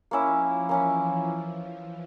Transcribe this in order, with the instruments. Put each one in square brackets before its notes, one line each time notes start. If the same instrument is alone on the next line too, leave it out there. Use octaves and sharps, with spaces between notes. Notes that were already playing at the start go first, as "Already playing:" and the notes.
[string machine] F3 [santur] A#3 C#4 E4
[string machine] E3 [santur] A#3 C#4 E4